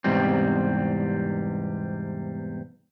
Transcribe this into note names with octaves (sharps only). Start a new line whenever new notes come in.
E2 G#2 C3 G3 C4